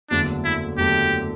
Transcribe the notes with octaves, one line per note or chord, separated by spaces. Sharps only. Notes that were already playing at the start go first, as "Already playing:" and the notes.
F#1 E2 D3 F#3 A3 D4
E4
F#1 E2 D3 F#3 A3 G4